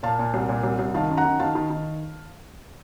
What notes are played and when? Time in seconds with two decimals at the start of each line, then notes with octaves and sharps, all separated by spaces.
0.03 A#2 F5 A5
0.19 A#2
0.34 C2
0.49 A#2
0.63 C2
0.79 C2
0.94 D#3 F5 A5
1.09 F#2
1.17 F#5 A#5
1.25 D#3
1.40 D#3 F5 A5
1.55 D#3
1.70 D#3